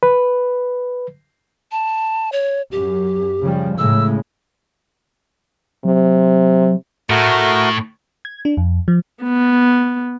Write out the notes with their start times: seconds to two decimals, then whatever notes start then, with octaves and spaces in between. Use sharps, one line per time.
0.03 B4
1.72 A5
2.32 C#5
2.72 F#2 G4
3.42 C#3 F3 G3
3.78 A2 C#3 G#3 E6
5.85 C3 F#3
7.10 A2 A3 F#4 A#4
8.25 G#6
8.45 D4
8.57 F2
8.88 F3
9.22 B3